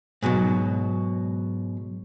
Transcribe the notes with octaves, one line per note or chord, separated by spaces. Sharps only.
G#2 B2 D#3 F#3